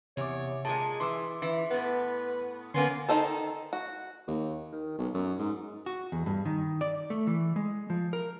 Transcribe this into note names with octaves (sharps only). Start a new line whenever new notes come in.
E2 C3 C#5 D6
A#2 G#3 G#4 A5
E3 C6 D6 E6
E3
A2 B3 B4
D3 A#3 B3 C#4 G#5 C6
D#3 A3 D#4 A4 C5
F#4
D#2
D#3
B1
F#2
G#2
F#4
E2
G2
D#3
D5
A3
E3
G#3
F3
A#4